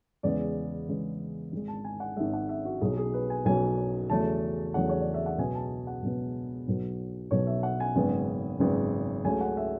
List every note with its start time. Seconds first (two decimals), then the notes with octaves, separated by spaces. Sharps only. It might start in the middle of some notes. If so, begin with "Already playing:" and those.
0.23 E2 C#3 G#3 B3 D5
0.89 E2 C#3 G#3 B3
1.52 G#1 G#2 G#3
1.68 A5
1.84 G#5
2.00 F#5
2.16 G#1 G#2 G#3 E5
2.33 F#5
2.49 E5
2.65 F#4
2.81 B1 B2 F#3 G#4
2.97 G#4
3.13 B4
3.30 G#5
3.45 B1 B2 F#3 G#5
4.10 E2 C#3 F#3 A3 A5
4.74 E2 C#3 F#3 A3 F#5
4.89 C#5
5.01 D5
5.14 E5
5.26 F#5
5.38 C#2 B2 F#3 B3 G#5
5.55 A5
5.87 F#5
6.02 C#2 B2 F#3 B3
6.67 B1 B2 F#3 B3
7.31 B1 B2 F#3 B3 C#5
7.47 E5
7.63 F#5
7.80 G#5
7.95 G#1 F#2 C#3 G#3 B3
8.59 G#1 F#2 C#3 G#3 B3
9.25 C#2 C#3 F#3 A3 G#5
9.41 F#5
9.57 E5